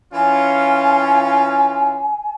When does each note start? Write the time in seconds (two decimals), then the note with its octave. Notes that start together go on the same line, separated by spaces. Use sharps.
0.13 E3 C#4 F4 G#5